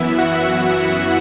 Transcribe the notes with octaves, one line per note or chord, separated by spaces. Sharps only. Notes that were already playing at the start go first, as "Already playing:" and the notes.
Already playing: F#2 E3 B3 E4 E5
F#4 F#5